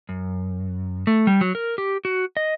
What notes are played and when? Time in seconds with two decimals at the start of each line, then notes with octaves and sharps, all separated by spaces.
0.09 F#2
1.07 A3
1.27 G3
1.41 F#3
1.55 A#4
1.78 G4
2.05 F#4
2.37 D#5